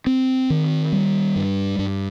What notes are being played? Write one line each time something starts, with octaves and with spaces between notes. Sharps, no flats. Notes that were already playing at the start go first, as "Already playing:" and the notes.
C4
D#3
G3
G2
G2